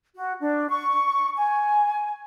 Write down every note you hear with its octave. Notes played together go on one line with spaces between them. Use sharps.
F#4
D4
C#6
G#5